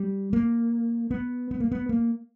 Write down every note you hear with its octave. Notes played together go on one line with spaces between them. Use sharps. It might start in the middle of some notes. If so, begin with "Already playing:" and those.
Already playing: G3
A#3
B3
B3
A#3
B3
A#3